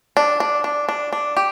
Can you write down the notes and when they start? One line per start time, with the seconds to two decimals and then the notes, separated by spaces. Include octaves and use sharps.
0.17 D4
0.40 D4
0.64 D4
0.89 D4
1.13 D4
1.37 G4